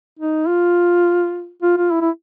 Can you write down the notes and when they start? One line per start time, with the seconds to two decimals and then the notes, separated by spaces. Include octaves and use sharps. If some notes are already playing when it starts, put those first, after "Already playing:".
0.19 D#4
0.48 F4
1.63 F4
1.77 F4
1.91 E4
2.01 E4